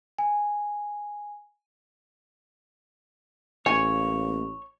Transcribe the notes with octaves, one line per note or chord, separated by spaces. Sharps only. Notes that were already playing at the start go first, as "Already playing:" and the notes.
G#5
A1 A#3 C#5 G#5